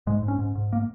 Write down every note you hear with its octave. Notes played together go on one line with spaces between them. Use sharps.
G#2 G#3
G#2
C#4
G#2
G#2
A#3